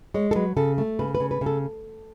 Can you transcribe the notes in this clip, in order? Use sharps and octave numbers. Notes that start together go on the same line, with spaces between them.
G#3 C#5
A4
F#3 B4
C#3 A4
A3
C#3 B4
B4
C#3
B4
C#3
A4